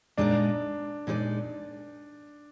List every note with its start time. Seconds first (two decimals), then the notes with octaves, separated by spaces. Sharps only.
0.17 A#2 G#3 D4 D#4 A#4 D5
1.07 A#2 G#3 D#4 A#4 D5